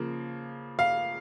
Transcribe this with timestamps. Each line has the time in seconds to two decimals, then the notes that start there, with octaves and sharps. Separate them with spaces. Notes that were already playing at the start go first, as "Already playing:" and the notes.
Already playing: C#3 F3 A#3
0.79 F5